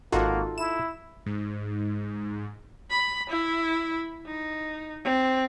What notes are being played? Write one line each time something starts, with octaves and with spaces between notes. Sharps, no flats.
G#1 A#3 D#4 F4 F#4 A4
E4 E7
G#2
B5
E4
D#4
C4